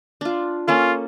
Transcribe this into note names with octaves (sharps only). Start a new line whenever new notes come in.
D4 F4
A#3 C#4 F4 A4